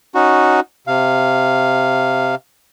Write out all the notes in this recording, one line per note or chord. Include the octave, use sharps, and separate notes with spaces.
C#4 D#4 F#4
C3 F5